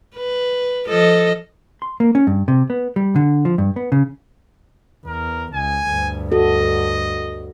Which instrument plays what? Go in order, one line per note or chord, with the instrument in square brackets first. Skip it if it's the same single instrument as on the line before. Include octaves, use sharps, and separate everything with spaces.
[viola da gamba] B4
F3 A4 D#5
[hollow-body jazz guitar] C6
A#3
C#4
G2
C3
B3
G3
D3
F3
G2
B3
C#3
[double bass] E2 [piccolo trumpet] A#4
[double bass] C#2 [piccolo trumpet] G#5
[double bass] D2 G2
[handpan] F#4 A4 [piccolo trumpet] D#5